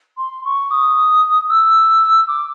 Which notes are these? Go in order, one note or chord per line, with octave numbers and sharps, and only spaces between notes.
C6
C#6
D#6
E6
D6